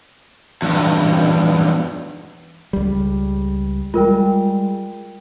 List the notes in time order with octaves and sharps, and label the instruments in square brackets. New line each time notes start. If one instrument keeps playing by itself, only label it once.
[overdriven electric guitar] E2 G2
[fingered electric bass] C#2 G3
[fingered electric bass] G3 G#3 [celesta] F4 A#4 G5